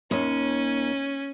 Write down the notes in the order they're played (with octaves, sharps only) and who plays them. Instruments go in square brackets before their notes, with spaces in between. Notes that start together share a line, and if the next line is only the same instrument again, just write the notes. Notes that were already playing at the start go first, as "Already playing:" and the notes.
[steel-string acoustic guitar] D#2 [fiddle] C#4